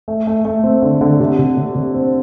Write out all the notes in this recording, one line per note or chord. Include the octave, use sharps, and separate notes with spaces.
A3
A3
A3
C4
D3
D3
C3
C3
C3
C3
C4